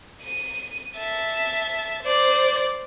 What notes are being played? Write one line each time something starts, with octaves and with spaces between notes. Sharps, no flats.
D#7
E5 A5
C5 D5